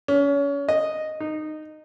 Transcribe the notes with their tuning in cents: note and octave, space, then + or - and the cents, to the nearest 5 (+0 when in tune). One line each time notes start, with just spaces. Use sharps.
C#4 +30
D#5 -5
D#4 -15